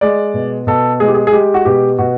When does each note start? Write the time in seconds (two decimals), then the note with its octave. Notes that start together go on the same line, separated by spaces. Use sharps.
0.01 G#3 D5
0.34 B2
0.67 B2 A4
1.00 G#3 G#4
1.08 G4
1.14 G#4
1.27 G#4
1.32 G#3 G4
1.54 F#4
1.65 B2 G4
1.99 B2 F#4